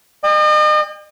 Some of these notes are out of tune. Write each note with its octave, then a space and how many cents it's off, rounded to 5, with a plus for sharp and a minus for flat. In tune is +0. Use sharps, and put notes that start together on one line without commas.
D#5 -40 G5 +40